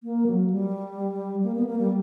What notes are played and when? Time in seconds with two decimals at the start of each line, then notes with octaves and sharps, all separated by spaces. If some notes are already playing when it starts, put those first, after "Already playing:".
0.03 A#3
0.27 F#3
0.50 G3
1.44 A#3
1.56 B3
1.67 A#3
1.79 G3